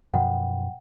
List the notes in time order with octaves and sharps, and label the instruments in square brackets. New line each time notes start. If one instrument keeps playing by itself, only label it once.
[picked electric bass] F#2 B2 F3 [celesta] F#5 G5